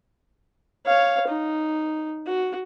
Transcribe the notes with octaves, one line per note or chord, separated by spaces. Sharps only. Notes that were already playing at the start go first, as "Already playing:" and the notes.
C#5 F5
D#4
F#4